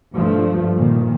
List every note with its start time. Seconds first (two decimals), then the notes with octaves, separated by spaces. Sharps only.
0.13 G2 F3 A3
0.76 A#2 D#3